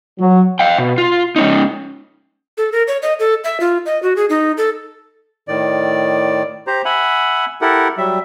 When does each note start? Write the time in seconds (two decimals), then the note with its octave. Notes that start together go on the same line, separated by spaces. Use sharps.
0.20 F#3
0.59 F5 G5
0.78 B2
0.98 F4
1.36 G#3 C#4 D#4
2.58 A4
2.72 A#4
2.87 C#5
3.02 D#5
3.19 A4
3.44 E5
3.60 F4
3.86 D#5
4.03 F#4
4.16 G#4
4.30 D#4
4.58 A4
5.48 A2 D#3 D5
6.67 G4 C5 A#5
6.85 E5 F#5 G#5 B5
7.61 E4 G4 A4 A#4 F#5
7.97 F#3 G3 E5